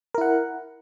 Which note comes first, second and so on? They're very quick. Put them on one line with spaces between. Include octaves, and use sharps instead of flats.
A#4 E4 F#5